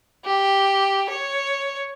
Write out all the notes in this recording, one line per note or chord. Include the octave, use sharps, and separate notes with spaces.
G4
C#5